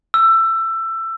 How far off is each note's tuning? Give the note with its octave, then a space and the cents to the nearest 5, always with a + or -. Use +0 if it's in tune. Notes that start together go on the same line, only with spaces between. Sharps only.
E6 +20